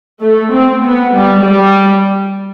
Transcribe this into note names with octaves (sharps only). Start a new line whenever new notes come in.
A3
C4
B3
G3
G3